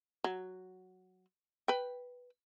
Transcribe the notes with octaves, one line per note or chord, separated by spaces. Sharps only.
F#3
B4 G5